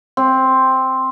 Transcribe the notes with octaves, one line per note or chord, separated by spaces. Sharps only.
C4